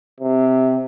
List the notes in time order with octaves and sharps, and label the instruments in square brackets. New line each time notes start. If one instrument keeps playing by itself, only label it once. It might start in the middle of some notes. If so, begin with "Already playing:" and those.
[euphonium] C3